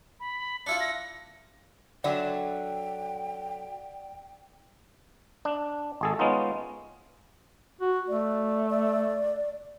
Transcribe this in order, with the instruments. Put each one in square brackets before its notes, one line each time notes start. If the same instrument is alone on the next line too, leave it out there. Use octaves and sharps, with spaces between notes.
[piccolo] B5
[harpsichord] D4 E4 F4 [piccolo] C#7
[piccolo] A#6
[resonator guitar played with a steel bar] D3 F#3 E5 [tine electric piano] D5 [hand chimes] F#5 [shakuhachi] G5
[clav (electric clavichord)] D4
G#1 G#4 A4
G#3 B3 C#4 D#4 F4
[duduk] F#4
[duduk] A3 [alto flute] D5
[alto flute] D5